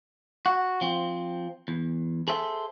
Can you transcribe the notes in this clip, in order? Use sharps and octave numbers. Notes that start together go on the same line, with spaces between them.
F#4
F3 C4
E2
G#4 A4 C5 E5